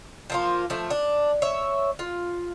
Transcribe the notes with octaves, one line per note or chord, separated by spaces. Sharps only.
F3 A#3 F4
F3 A3
D4
C#5 E5
F4